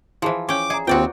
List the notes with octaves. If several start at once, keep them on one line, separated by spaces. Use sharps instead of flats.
E3 F3 E4 G#4 C5
C#4 G5 D6
G#4 D5 A#5
D#2 C4 F4 F#4 B4 C5 D5 G5